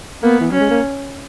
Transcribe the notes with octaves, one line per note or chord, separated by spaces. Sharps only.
A#3 B3
E3
F#3 C#4
G#3
A#3